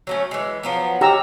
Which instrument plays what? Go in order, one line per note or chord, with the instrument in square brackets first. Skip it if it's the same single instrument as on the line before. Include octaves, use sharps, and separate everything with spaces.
[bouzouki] F#3 A3 C#4
E3 G#3
F3 F#3 B3
[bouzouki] C#4 [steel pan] G4 A#5 E6